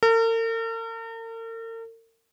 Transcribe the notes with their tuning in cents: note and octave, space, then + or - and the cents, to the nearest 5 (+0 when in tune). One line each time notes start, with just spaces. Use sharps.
A#4 -45